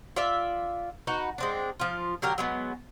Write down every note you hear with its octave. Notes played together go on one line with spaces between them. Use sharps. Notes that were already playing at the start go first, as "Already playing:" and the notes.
F4 D5 E5
D#4 F#4 B4
G#3 C4 D4
F3 F4
D3 F#3 G4 A#4
F#3 G#3 B3